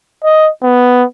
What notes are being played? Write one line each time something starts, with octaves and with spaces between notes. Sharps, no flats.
D#5
B3